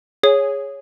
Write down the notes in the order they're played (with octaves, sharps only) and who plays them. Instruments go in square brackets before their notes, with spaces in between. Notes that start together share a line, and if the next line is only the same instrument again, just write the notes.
[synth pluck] G#4 [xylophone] C#5